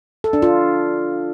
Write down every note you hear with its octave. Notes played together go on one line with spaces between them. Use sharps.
A4
D4
F4